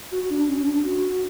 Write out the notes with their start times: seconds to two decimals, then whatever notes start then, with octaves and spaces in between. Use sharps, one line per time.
0.12 F#4
0.30 D4
0.48 C#4
0.66 D4
0.84 F#4